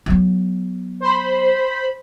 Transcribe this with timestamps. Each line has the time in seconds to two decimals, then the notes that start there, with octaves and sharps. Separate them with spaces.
0.06 F#3 B3
1.00 C5 B5